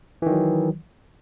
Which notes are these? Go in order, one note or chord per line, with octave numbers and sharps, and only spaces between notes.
D#3 E3 F#3